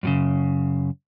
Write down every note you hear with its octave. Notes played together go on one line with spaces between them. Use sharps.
F#2 A2 C#3